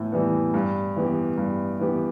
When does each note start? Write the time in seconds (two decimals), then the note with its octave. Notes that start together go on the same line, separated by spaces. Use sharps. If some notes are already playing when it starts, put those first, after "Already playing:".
Already playing: A2 E3 B3
0.12 E3 G3 B3
0.54 G2
0.96 E3 B3 G4
1.38 G2
1.80 E3 B3 G4